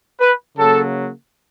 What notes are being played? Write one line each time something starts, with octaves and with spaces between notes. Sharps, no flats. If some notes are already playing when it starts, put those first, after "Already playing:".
B4
C#3 F#3 A#3 A4